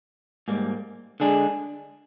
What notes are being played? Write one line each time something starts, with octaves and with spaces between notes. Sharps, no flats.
G#2 G3 A#3
D3 G#3 D4 G#4